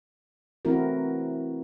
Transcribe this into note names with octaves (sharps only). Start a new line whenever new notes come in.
E3 A3 C4 E4 F#4 A#4